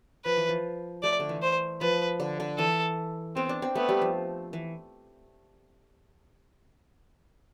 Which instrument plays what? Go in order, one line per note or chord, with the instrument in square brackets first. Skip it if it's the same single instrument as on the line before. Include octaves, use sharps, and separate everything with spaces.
[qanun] F3 [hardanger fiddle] B4
[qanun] E3
F3
[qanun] A3 [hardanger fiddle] D5
[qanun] D3
E3
[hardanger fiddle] C5
[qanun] F3 [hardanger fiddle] B4
[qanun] D3
D3
[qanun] E3 [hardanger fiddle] A4
[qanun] B3 [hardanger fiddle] C4
[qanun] D4
C4
[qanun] A3 [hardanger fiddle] B3
[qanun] G3
F3
E3